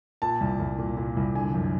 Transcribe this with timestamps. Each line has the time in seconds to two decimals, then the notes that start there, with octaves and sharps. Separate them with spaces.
0.22 A#2 A5
0.41 C2
0.60 C2
0.78 A#2
0.97 A#2
1.17 C2
1.35 D3 G#5
1.54 F#2